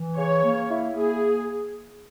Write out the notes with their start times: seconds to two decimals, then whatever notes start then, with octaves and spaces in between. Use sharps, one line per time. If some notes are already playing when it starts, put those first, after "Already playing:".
Already playing: E3
0.17 C#3 C#5
0.43 A#3
0.70 E4
0.97 A#3 G#4